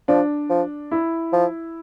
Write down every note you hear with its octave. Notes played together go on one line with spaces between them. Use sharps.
F3 D4
F3
E4
F3